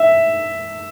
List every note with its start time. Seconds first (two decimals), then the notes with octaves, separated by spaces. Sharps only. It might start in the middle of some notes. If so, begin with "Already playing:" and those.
Already playing: E5